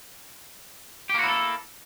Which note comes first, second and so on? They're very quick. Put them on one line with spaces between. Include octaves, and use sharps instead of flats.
G4 A#3 F#4 E4 A4